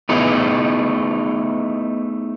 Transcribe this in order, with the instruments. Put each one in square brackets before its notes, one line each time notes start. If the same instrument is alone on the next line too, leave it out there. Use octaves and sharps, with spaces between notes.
[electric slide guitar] A3 B3 D#4 E4 G#4